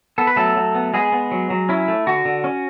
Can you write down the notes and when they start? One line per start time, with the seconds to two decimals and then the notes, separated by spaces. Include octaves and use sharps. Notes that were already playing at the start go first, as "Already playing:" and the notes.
0.18 B3 A4
0.27 B4
0.36 F#3 A3 A4
0.57 F#3
0.75 B3
0.94 G#3 B3 G#4
1.12 B3
1.31 F#3
1.50 F#3
1.69 C#4 E4
1.88 A3
2.07 D3 F#4
2.25 D3
2.44 C#4